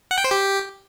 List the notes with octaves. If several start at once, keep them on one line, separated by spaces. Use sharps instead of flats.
F#5
G5
C5
G4